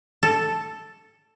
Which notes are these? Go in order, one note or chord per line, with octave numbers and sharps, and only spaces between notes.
A4